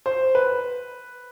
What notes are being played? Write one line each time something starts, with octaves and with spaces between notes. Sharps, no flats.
C5
B4